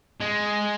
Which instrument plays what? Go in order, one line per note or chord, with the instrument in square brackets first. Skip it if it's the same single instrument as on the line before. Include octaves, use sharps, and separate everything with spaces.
[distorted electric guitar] G#3